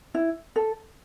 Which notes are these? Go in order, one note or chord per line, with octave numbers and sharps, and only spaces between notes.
E4
A4